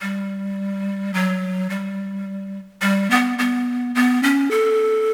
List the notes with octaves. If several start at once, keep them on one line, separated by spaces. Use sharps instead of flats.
G3
F#3
G3
G3
B3
B3
B3
C#4
A4